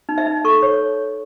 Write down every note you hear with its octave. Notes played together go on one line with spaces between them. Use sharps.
D#4
E5
D#4
A4 C#6
C#5